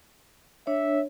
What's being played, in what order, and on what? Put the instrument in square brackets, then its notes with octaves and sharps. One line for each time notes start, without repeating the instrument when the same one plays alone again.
[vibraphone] D4 C#5 [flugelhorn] E5